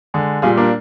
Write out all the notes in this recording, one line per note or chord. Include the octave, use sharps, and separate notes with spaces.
D3 G#3
A#2 G3 F4 G#4
A#3 D4